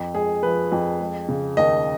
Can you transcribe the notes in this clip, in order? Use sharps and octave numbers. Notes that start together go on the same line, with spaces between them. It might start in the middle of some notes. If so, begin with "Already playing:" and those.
Already playing: F2
G#3 G#4
F3 B4
F2
G#3
C#3
D#2 D#5